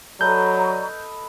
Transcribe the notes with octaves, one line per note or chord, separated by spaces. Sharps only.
F#3 A4 B4 D5 D#5 A#5 C#6 G6